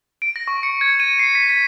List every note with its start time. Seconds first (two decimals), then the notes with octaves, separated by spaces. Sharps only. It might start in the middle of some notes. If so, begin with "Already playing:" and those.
0.22 D7
0.36 A#6
0.48 C#6
0.63 C#7
0.81 G#6
1.00 D#7
1.19 C7
1.35 B6
1.50 B6